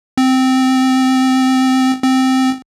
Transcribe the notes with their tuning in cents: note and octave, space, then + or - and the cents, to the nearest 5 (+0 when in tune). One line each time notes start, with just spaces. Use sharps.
C4 -10
C4 -5